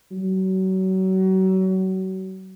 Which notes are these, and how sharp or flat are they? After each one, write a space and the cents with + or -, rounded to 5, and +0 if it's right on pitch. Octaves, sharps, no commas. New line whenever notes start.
F#3 +30